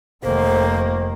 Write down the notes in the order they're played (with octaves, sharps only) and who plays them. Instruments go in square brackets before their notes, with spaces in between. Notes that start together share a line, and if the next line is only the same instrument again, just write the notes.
[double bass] F1 D#3 [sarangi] A#3 [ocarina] C5